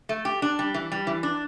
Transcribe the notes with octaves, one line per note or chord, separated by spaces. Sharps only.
A3
G4
D4
G3
E3
G3
E3
D4